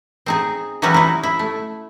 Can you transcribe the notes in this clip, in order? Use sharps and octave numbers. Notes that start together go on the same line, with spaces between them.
C4 D#4 G#4
E3 F#3 G3 C#4 D#4 F#4
D#4 E4
E4
A3